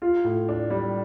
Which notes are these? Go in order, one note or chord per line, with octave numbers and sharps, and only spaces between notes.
F4
A2
D4
G3